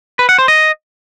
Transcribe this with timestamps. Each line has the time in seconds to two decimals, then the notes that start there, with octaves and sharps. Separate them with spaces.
0.19 B4
0.29 F#5
0.38 C5
0.48 D#5